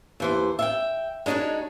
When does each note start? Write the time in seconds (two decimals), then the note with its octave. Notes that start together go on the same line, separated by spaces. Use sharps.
0.20 D#2 E3 C5
0.59 E5 F5 G5
1.26 G#3 D4 D#4 F#4 C#5